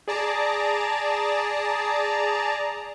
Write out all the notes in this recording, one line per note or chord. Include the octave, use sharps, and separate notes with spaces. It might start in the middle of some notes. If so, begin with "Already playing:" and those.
G#4 D5 A5 A#5